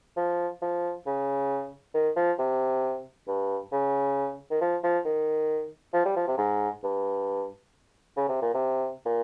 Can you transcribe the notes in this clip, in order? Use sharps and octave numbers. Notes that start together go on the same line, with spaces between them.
F3
F3
C#3
D#3
F3
C3
G2
C#3
D#3
F3
F3
D#3
F3
G3
F3
C3
G#2
G2
C#3
C3
A#2
C3
A#2